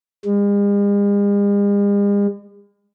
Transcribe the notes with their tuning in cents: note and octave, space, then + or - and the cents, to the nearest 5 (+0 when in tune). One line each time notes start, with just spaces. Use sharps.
G#3 -45